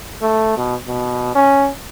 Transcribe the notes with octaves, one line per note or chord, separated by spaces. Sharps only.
A3
B2
B2
C#4